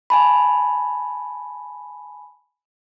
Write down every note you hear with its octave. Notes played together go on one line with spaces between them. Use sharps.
G#5 A5 B5